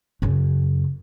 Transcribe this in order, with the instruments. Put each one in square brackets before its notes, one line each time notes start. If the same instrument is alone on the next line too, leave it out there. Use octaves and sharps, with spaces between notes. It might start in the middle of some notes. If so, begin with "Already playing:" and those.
[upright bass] F#2 C#3